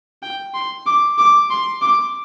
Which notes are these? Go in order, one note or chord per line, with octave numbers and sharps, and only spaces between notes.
G5
C6
D6
D6
C6
D6